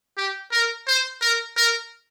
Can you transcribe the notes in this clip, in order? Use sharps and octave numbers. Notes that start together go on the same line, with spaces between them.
G4
A#4
C5
A#4
A#4